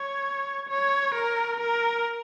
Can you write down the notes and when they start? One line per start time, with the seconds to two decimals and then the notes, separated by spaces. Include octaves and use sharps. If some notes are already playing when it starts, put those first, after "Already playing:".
Already playing: C#5
0.69 C#5
1.15 A#4
1.61 A#4